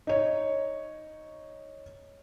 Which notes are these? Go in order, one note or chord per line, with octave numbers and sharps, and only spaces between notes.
D#4 C#5